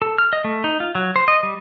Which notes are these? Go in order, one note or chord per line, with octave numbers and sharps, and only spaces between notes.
A4
F6
D#5
A3
D#4
F4
F#3
C5
D#5
G3